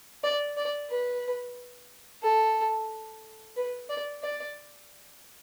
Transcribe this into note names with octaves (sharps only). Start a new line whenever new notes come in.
D5
D5
B4
A4
B4
D5
D5